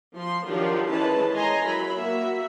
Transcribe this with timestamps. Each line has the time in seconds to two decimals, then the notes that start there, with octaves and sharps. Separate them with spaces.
0.15 F3 C6
0.47 D#3 F3 F#3 D4 G4 A#4
0.91 D#3 E3 G#3 C#4 B4 A5
1.35 C#5 D#5 G#5 A#5 C6
1.65 F#3 E4 A#4 B5
1.94 A#3 F#4 E5